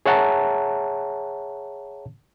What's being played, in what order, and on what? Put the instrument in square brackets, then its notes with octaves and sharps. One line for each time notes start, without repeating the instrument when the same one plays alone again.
[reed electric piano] G#4 C#5 E5 F#5 A5 A#5